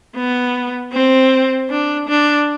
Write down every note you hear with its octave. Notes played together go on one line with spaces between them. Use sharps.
B3
C4
D4
D4